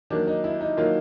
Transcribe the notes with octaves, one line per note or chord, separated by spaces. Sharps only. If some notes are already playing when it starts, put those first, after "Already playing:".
D#3 F#3 A#3 D4
D#4
E4
D#4
D#3 F#3 A#3 F4